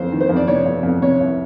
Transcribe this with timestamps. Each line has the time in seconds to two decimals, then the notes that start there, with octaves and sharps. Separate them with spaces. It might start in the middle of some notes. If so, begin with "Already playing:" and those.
Already playing: F2 C#3 C5
0.12 D#3
0.21 C5
0.29 F2
0.36 D5
0.47 C3 C#5
0.65 F2
0.83 F2
1.02 C3 C#5
1.20 C2